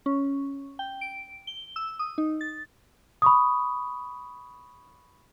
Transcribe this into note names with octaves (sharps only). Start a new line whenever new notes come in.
C#4
G5
D7
G7
E6
D#6
D#4
A6
B5 C#6 D#6